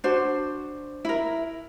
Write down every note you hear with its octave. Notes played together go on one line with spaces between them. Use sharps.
D4 F#4 C5
E4 A#4